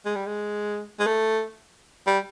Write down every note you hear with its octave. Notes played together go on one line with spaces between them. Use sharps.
G#3
G3
G#3
G#3
A3
G3